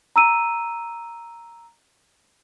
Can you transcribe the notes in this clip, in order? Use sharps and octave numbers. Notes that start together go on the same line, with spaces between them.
A#5 E6 D#7